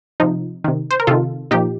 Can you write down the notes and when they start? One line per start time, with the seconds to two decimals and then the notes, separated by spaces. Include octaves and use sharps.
0.20 C3 F3 D#4
0.64 C3 D#3
0.91 C5
1.00 A#4
1.07 C3 D#3 F4 A4
1.51 A#2 F3 D#4 G4